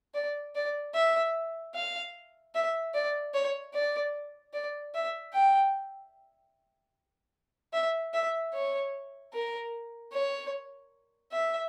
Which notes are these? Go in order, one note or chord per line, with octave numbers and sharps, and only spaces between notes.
D5
D5
E5
F5
E5
D5
C#5
D5
D5
E5
G5
E5
E5
C#5
A#4
C#5
E5